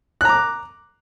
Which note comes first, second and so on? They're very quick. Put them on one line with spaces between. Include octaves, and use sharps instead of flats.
F#6 A#5 D6